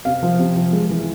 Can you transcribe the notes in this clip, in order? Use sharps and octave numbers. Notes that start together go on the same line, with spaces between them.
C3 F5
F3
C3
F3
G#3
E3